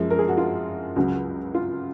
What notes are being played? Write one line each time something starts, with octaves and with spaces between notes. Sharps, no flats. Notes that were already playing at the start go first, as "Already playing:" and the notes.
Already playing: F#2 F3 G#3
A#4
G#4
F#4
F4
C#2 C#3 F#3 F#4
F4